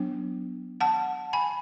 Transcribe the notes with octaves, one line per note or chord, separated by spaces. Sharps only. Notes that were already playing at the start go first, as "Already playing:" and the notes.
Already playing: F#3 B3 D4
F#5 A5
G#5 B5